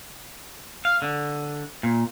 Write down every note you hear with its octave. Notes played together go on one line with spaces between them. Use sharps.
F5
D3
A#2